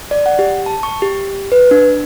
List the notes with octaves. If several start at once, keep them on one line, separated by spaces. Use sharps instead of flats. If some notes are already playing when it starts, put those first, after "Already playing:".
D5
F#5
G4
A5
C#6
G4
B4
D4